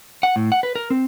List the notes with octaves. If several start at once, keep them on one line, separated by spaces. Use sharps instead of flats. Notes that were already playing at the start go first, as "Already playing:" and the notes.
F#5
A2
F#5
B4
A#4
C4